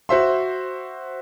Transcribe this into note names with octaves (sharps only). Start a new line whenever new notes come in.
F#4 C5 E5 C6